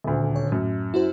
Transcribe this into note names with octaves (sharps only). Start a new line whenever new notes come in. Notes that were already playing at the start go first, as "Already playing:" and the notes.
D#1 D2
C#5
F#2 A2
E4 F#4 C5